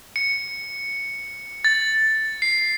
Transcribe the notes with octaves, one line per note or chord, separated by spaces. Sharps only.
C#7
A6
C7